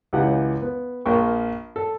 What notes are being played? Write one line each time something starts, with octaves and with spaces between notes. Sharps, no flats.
C#2 E3 D#4 G4 G#4 F#5
B3
A#1 A#3 G5 C#6
A4